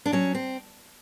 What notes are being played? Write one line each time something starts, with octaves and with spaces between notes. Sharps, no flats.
D4
F#3 C#4
C4